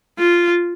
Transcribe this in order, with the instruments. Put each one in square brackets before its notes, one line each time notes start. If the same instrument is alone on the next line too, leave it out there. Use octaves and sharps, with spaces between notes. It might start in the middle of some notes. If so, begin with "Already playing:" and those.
[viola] F4